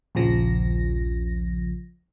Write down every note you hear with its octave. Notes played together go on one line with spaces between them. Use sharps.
A#1 D#2 C#3 F3 A#6